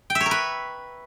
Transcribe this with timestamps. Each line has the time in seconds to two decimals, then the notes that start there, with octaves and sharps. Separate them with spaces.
0.10 G5
0.15 E5
0.21 C#5
0.26 A#4
0.31 B4